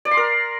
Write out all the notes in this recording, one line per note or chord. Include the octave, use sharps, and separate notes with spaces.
D5
C6
A#4